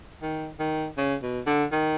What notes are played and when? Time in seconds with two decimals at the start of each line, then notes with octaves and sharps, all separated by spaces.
0.22 D#3
0.60 D#3
0.98 C#3
1.23 B2
1.47 D3
1.72 D#3